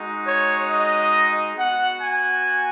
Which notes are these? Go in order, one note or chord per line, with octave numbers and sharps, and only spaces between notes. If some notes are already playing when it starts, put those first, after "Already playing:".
Already playing: G#3 D#4 F#4
C#5
D#5
B3 F#4 F#5
G#5